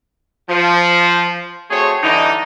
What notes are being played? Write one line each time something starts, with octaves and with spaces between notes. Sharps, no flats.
F3
A3 C4 F#4 G#4 C5 C#5
D3 E3 G3 D#4